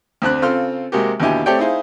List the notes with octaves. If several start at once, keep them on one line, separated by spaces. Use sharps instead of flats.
D2 C4 D4 F#6
C#3 C4 F4 A4 C6 F6
C3 G#3 A#3 F#4 G4
D#2 B2 D3 E4 G4 G#5
A3 C4 G4 C#5 D5 G5
D#4 E4 G#4 C5 F5